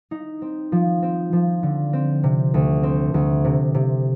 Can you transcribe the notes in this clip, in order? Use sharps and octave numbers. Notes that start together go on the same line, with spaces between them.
D#4
C4
F3
C4
F3
D3
C4
C3
D2
C4
D2
C3
C3